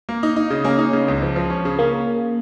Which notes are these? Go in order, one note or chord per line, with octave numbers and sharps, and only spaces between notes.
A#3
D#4
D#4
C#3
A#3 C#4
D#4
C#3
C#2
F3
F3
C#4
C#3
A#3 C#4